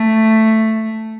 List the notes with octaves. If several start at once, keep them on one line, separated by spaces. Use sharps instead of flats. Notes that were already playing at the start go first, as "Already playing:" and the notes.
Already playing: A3